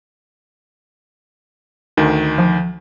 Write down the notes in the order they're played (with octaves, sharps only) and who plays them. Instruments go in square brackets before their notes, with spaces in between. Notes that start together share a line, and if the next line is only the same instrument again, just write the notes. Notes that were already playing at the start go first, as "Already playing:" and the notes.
[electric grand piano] D2 D#3
[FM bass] F3